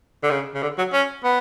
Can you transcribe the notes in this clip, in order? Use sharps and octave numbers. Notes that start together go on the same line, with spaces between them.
D3
C#3
C#3
D3
F#3
C#4
B3